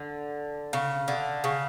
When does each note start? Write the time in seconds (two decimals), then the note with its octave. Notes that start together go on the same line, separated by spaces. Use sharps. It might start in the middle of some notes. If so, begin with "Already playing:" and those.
Already playing: D3
0.73 C#3
1.08 D3
1.44 C#3